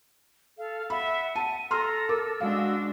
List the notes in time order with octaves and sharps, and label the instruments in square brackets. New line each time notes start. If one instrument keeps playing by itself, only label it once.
[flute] A4 [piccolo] F5
[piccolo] E5 [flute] F#5 [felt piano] B5
[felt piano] A5 [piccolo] D#7
[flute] A4 [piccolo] A#5 [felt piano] C6 E6 F6
[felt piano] A#4 D6 [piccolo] E6
[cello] G#3 D4 [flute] F#4 [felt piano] F5